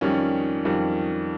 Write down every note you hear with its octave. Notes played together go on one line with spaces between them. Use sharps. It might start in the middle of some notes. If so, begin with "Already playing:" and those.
F2 D#3 G3 C#4
F2 D#3 G3